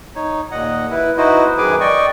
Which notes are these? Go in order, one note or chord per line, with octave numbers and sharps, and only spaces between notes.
D#4 C#5
D#2 A#2 D#5 F#5
E4 B4
D#4 E4 F#4 B4 C5 D#5
F#2 D#3 G#4 B4 G#5 D6
D5 D#5 G5 C#6